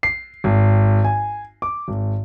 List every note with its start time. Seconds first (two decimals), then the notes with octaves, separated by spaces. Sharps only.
0.03 C7
0.44 G#1
1.05 G#5
1.62 D6
1.88 G#1